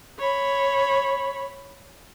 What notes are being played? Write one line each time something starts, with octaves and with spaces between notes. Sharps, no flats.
C#5 B5